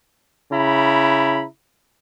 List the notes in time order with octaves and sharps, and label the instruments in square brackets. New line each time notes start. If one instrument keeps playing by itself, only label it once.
[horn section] C#3 E4 A#5 B5